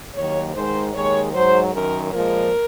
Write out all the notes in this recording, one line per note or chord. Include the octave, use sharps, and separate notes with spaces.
D#2 D#3 F#3 C#5
G#2 D#3 G#3 C5
D#2 D#3 G#3 C#5
G#2 F#3 C5
F#2 D#3 F#3 A#4
A#2 F3 G#3 A#4